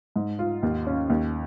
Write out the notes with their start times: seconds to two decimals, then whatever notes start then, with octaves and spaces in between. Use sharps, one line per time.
0.16 G#2
0.39 F4
0.63 D#2
0.87 C#4
1.10 D#2